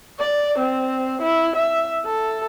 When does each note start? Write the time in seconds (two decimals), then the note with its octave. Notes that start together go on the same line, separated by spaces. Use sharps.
0.20 D5
0.59 C4
1.22 E4
1.56 E5
2.06 A4